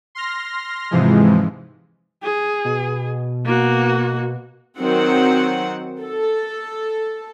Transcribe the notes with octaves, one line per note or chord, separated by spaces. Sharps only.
C6 F6 A#6
G#2 C3 E3 F3 G#3
G#4
B2
A#3 F#4
D#3 F#3 C4 F#5
A4